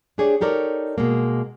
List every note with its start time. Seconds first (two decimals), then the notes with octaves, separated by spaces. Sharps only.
0.18 D4 G4 G#4 C#5 D5
0.41 D#4 G4 A4 A#4 C#5 D5
0.98 B2 G#3 A#3